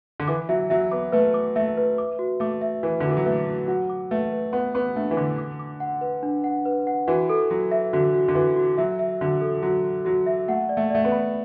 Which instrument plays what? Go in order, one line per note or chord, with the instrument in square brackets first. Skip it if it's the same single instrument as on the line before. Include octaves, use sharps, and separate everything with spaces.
[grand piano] D3
[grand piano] E3 [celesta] D6
[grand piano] F#3 [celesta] E5
[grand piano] F#3 [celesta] E5
[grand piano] B3 [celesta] D6
[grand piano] A3 [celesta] B4
[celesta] D6
[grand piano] A3 [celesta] E5
[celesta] B4
D6
F#4
[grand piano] A3 [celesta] D6
[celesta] E5
[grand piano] E3 [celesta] B4
[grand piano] D3
[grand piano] E3 [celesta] F#4
[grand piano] F#3
[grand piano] A3 [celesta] B4
[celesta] F#4
[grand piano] F#3 [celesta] F#5
[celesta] D6
[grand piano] A3 [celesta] B4
[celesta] B4
[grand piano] B3 [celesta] F#5
[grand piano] B3 [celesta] D6
[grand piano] A3 [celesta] D4
[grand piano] E3
[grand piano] D3 [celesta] D6
[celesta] D6
D6
F#5
B4
D4
F#5
B4
F#5
[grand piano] E3 [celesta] F#4
[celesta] A4
[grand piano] F#3 [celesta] F#4
[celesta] E5
[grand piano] D3 [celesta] F#4
[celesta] F#4
[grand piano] D3
[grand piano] E3 [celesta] F#4
[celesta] F#4
[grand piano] F#3 [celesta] E5
[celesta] E5
[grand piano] D3 [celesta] F#4
[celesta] A4
[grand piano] F#3 [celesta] F#4
[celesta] F#4
[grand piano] F#3 [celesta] F#4
[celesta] E5
[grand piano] A3 [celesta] F#5
[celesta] D5
[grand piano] A3
[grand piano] A3 [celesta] D5
[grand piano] B3
[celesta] B5